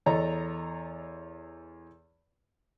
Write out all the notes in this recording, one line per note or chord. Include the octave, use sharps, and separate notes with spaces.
E2 A4 C#5 D#5 A#5